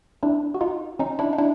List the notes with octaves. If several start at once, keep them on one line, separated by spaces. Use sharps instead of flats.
D4 E4
F#4
D#4 F4
C#4 D#4
D4 E4
D#4
D4 E4